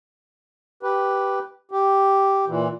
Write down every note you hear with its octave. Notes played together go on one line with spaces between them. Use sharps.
G4 B4
G4
A#2 E3